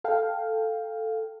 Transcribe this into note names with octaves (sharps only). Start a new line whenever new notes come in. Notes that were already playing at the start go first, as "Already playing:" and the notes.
A4 F5 G5